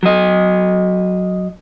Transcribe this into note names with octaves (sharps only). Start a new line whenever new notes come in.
F#3 D#5